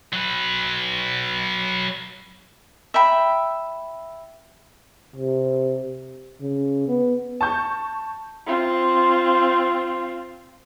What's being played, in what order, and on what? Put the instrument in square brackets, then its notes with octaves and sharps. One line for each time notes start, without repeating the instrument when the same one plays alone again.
[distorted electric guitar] F#3 B4
[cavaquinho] E5 G5 B5
[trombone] C3
[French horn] C#3
B3
[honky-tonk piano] A5 C#6 G6
[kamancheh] C4 F4